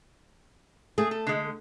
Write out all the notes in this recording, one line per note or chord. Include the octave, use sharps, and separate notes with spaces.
A3 G#4
A4
D3 G#3